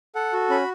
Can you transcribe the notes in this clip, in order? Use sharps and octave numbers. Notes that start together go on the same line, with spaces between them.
A4 F#5
F#4
C#4 B5